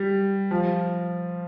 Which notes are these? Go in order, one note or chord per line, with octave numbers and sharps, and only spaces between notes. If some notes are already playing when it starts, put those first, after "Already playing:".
Already playing: G3
F3